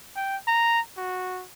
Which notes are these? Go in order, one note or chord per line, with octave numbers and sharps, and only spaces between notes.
G5
A#5
F#4